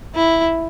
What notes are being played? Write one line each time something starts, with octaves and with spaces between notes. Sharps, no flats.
E4